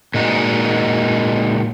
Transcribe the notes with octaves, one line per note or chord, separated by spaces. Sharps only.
A#2 G#3 D#4 F#4